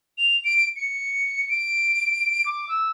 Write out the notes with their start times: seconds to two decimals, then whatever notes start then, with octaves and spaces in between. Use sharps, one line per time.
0.18 F7
0.44 D7
0.76 C#7
1.49 D7
2.46 D6
2.69 E6